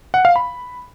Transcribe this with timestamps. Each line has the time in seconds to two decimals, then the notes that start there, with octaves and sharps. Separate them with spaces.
0.14 F#5
0.25 F5
0.36 B5